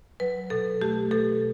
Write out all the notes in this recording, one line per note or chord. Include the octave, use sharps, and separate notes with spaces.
F#3 B4
B2 A4
A3 G4
B2 A4